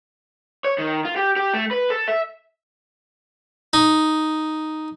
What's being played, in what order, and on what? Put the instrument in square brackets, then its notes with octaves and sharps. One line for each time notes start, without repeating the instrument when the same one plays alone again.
[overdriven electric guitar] C#5
D#3
F4
G4
G4
A3
B4
A4
E5
[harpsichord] D#4